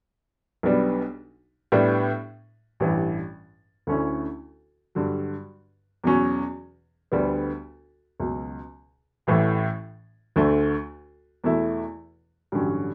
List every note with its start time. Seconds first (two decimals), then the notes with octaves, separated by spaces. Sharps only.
0.63 B1 B2 G3 B3 D4
1.72 A2 G3 B3 D4
2.80 A1 G2 E3
3.87 D2 D3 A3 C#4 E4
4.95 G2 D3 F#3
6.04 E2 B2 F#3 C#4
7.12 D2 D3 G3 B3
8.20 C#2 B2 F#3
9.27 A1 A2 E3 A3
10.36 D2 D3 A3
11.44 E2 B2 A3 E4
12.52 A1 G2 D3 F#3 C#4